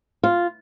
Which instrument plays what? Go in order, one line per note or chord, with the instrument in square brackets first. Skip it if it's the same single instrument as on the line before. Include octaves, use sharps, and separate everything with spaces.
[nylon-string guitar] F4